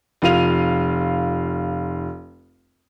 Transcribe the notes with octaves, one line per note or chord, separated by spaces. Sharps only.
F1 F4 F5 D#7 F7